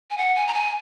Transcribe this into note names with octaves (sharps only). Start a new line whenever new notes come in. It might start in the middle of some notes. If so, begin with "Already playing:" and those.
G#5
F#5
G#5
A#5
G#5